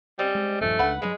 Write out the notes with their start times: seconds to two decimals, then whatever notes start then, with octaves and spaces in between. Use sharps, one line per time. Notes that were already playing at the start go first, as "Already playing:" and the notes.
0.19 G3 C4 C#4 D#5
0.35 G#3
0.61 D#1 G2 F3 A3
0.79 C#2 D4 B4 F#5
1.02 G2 F#3 G#3 D#4 B4